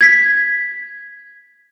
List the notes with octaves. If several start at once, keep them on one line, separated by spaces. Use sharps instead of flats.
G#6 B6